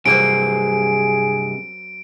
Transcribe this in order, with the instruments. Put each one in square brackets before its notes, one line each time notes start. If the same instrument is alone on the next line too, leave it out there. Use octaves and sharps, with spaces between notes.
[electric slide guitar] G2 C3 [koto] F#3 A#3 C4 [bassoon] G#4 [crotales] D7